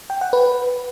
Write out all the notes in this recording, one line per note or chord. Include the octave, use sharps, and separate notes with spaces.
G5
F#5
B4